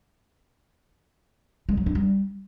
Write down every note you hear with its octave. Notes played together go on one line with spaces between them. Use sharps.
G#3
F#3
D4
G3